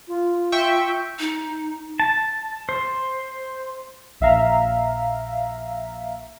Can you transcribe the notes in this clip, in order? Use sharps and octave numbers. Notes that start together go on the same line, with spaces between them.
F4
E5 G5 C#6
D#4
A5
C5
A#1 E5 F5 A#5